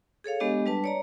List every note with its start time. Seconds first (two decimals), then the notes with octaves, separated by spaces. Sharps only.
0.24 G#4 A4 C#5 F5
0.40 G#3 B3 D4 G4 D#5
0.66 G3 D4 B4 A5
0.84 C#5 D5 A#5